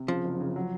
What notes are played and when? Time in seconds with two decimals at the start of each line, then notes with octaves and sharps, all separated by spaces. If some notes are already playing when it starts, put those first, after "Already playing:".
Already playing: C3
0.08 C#3 F3
0.25 F#1
0.40 C#3
0.56 F#3